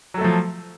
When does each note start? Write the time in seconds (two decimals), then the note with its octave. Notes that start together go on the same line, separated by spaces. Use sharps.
0.14 F#3
0.18 A4
0.21 A3
0.24 F3